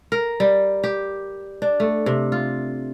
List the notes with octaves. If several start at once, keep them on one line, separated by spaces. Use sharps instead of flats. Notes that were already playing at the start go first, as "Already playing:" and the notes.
A#4
G3
G4
D4
A3
C3
F4